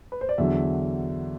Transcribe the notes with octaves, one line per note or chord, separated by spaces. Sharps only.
B4
C5
D5
E2 D3 F#3 E5